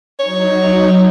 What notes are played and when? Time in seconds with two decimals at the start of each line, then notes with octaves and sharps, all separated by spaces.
0.20 F#3 D#4 C#5